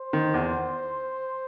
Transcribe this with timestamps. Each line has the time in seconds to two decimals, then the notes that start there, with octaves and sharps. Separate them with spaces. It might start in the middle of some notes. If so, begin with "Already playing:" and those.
Already playing: C5
0.13 D#3
0.34 E2